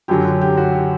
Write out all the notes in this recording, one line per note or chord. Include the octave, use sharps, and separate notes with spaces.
F#2 D3 F#3 G4
G4
F#4
G4